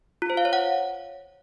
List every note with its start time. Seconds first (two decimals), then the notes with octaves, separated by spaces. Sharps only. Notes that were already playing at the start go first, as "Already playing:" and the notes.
0.22 F4
0.30 C5
0.37 F5
0.45 C#5
0.53 F#5